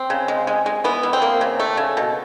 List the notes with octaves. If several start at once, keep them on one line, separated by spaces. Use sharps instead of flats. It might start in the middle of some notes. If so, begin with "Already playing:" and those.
Already playing: C4
C#3
G#3
G#3
G#3
E3 B3
E3
C4
A#3
C#3
A3
C#3
B2